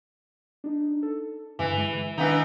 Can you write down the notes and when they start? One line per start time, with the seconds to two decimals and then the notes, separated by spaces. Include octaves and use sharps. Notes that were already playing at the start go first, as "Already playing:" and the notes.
0.64 D4 D#4
1.03 A4
1.59 G2 D3 E3
1.77 G#3
2.18 D#3 E3 B3 D4 D#4